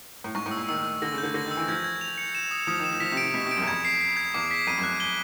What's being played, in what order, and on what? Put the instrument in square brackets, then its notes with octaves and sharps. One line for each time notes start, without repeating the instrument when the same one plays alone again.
[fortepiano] A2
[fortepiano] G#2 [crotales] C#6
[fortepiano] A2
[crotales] E6
[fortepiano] A#2
[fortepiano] D#3 [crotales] E6
[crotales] E6
[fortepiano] D3 [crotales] A#6
[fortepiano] C#3
[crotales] G6
[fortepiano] D3
[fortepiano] D3 [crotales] A#6
[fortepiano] D#3
[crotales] E6
[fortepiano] E3
[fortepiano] F3 [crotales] G#6
[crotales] G#6
F7
C#7
E7
D#6
[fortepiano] F3 [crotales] D#6
[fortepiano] D#3
[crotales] E7
[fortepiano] F3
[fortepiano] F3 [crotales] B6
[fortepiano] C3
[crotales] D7
[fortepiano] C3
[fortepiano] B2 [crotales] B6
[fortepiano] C3
[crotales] D7
[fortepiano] F#2
E2
[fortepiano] F2 [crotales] G#6
[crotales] C7
C7
G#6
[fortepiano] E2 [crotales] D6
[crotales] B6
[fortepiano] F2 [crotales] D#7
[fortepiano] F#2
[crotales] F#6
G7